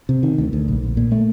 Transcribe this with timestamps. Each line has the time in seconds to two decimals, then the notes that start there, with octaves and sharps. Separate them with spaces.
0.09 C3
0.23 D#3
0.38 D2
0.53 D2
0.68 A#1
0.83 A#1
0.97 A#2
1.12 A3